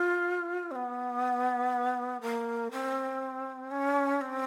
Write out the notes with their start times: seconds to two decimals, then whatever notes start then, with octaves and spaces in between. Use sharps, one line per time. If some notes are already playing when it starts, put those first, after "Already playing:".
Already playing: F4
0.71 C4
0.75 B3
2.21 A#3
2.72 C4
3.71 C#4
4.21 C4